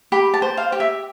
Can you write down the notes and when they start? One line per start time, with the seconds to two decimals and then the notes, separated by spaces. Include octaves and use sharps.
0.12 G4 B5
0.34 A5
0.42 C5
0.57 F5
0.72 G4
0.80 E5